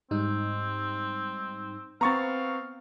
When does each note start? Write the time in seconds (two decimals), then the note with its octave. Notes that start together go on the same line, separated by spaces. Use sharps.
0.11 G#2 G3 C4 D#4
2.01 B3 C4 F5 A#5 C#6 A6